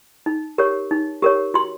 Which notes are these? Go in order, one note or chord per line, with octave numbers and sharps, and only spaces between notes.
D#4
G4 A#4 C#5
D#4
G4 A#4 C#5
F#4 C6